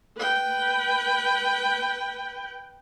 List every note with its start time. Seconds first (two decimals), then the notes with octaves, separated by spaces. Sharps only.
0.17 B4 G5